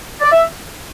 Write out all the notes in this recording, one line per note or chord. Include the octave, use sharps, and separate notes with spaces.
D5
E5